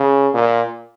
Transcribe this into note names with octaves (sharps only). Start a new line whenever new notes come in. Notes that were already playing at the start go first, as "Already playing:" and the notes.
Already playing: C#3
A#2